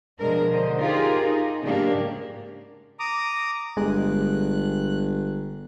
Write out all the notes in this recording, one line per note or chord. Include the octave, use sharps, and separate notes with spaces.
B2 F3 G#3 D4 A#4
D3 C5 D#5
D#4 F4 G4 G#4 A#4
D#4
G#2 C#3 A#3 D4 G4
A#5 D6 D#6
G1 G#3 F#6